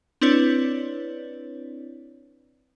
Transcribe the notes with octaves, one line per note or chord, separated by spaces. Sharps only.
C4 D4 E4 B4 C#5 D5